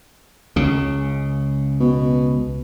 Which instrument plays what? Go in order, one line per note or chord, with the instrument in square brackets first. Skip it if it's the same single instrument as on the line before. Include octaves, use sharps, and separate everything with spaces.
[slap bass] C#2 C#3
[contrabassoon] B2